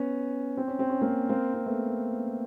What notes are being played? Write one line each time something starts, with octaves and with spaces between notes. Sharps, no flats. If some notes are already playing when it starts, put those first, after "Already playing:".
Already playing: B3 C#4
C4
C#4
C4
C#4
A#3 C4
A#3 C4
C4
A3 B3